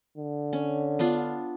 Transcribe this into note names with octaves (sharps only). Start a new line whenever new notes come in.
D3
C#4
B3 D4 F4